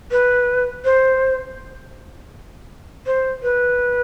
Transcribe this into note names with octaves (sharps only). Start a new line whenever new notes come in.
B4
C5
C5
B4